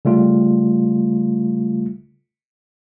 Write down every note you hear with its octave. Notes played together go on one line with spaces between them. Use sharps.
C#3 G3 A3 F4